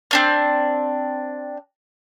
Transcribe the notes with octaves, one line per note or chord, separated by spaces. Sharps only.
C4 D4 F6